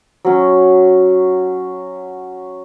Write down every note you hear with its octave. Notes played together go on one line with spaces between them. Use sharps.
F#3 C#4